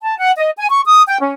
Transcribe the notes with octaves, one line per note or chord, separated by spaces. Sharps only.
A5
F#5
D#5
G#5
C#6
D#6
G5
C#4